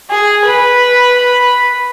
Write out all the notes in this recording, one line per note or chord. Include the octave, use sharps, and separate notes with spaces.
G#4
B4